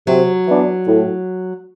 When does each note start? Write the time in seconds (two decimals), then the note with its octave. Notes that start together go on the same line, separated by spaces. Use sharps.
0.07 C3 F#3
0.47 E3 B3 D4
0.87 A2